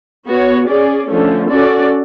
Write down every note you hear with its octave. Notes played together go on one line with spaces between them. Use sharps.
B3 F#4 C#5
C#4 G#4 D5
D3 F3 A3 C#4
C#4 F#4 A4 D5